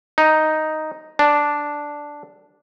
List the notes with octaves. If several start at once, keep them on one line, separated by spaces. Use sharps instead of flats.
D#4
D4